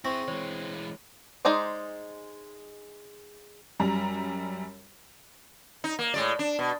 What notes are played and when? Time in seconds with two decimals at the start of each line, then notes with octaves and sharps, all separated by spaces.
0.05 C4 E4 G#4 C#6 A#6
0.28 E3 G#3 C#5
1.45 G#3 D#4 G#4 C5 D5
3.80 F#2 G3 A#5
5.84 D#4
5.99 A#3
6.14 A2 G#3 D5
6.39 D4
6.59 B2